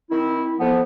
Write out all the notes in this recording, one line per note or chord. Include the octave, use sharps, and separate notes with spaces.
D#3 C4 E4
F2 F3 B3